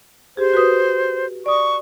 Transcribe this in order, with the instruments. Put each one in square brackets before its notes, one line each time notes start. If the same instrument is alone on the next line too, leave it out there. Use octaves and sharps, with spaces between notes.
[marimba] G4 G#4 [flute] C5
[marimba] F#4 B4 D#6
[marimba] D5 D#6 [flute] C#6